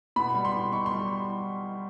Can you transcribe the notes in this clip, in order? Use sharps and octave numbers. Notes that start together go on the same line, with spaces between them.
B2 B5
G3
C6
B2
D#4 C#6
G3 C6